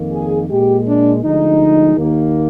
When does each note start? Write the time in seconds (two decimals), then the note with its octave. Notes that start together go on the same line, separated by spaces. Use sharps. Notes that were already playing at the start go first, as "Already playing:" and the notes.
Already playing: F2 D#3 A#3
0.11 G#4
0.49 A#2 G#3 G4
0.85 D4
1.23 D2 D3 F3 G#3 D#4
1.96 D#2 D#3 A#3